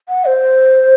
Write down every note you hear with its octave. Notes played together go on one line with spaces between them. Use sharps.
F#5
C5